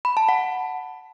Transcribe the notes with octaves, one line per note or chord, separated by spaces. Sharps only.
B5
A5
F#5